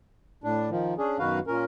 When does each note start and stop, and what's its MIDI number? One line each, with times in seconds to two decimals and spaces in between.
0.44 0.70 45
0.44 0.70 62
0.71 0.94 51
0.71 0.94 53
0.98 1.18 61
0.98 1.18 62
0.98 1.18 68
1.19 1.39 42
1.19 1.39 47
1.19 1.39 51
1.19 1.39 66
1.19 1.39 71
1.19 1.39 77
1.47 1.64 46
1.47 1.64 61
1.47 1.64 70